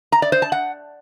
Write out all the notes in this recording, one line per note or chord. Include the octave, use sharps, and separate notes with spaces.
A#5
D5
C5
A5
F#5